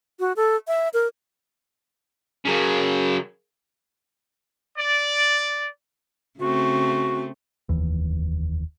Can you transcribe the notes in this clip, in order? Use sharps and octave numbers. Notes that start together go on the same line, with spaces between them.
F#4
A4
E5
A#4
C#3 F#3 G#4 A#4 F5
D5
C#3 A3 C4 F#4
F1 D#2 E3